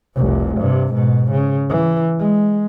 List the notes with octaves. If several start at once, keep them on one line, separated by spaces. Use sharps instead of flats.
F1 C2
G2 C3
G#2 B2
C#3
E3
G#3